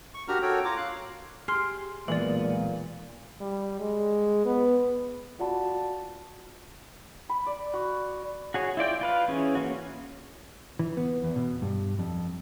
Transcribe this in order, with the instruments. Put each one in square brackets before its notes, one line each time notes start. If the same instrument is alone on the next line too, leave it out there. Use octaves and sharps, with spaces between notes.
[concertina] C#6
D4 F#4 G4 A#4 A#5 F6
F#4 A4 A#4 C#5 G5
F4 C#5 A#5 D6
F5 F#6
[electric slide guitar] G4 G#4 [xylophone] C6 F6 C7
[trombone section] B1 A#2 [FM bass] E3 [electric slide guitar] G#3 A#3 B3 [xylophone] D5 F#7
[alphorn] G3
G#3
B3
[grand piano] F4 F#4 D5 F#5 A5 B5
[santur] B5
D5
F#4
[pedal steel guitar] F#4 G#4 C#5
E4 F4 D5 G5
F4 B4 F5
E3 C#4 G#4
A#3 C#4 F#4
[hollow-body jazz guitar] E3
B3
E2
B2
G2
F2